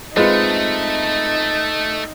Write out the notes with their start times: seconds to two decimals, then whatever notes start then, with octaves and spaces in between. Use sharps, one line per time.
0.17 G#3 A3 C4 D#4 F4 B4